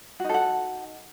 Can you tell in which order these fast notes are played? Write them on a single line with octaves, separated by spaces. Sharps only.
F#4 D#4 A4 F#5